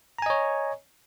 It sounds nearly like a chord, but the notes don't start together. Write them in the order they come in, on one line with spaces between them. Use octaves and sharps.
A#5 G#5 D#5 C#5